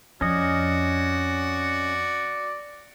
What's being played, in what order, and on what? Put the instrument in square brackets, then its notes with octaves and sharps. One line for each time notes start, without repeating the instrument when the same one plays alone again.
[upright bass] F2 [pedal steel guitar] C#4 D#5 [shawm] F#4 [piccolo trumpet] D5